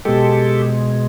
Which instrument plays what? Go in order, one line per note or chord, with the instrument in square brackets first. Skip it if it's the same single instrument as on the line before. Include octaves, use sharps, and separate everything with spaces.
[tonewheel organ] B2 G#3 G4 A4